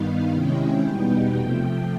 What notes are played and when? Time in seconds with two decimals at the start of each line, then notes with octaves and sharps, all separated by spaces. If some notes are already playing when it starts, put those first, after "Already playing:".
Already playing: G2 D#3 G3 B3 D#4 F5
0.33 C3 D#3 G#3 C#4 E4 G5
0.85 E2 B2 G3 B3 D#4 G5
1.38 C3 F3 A3 G5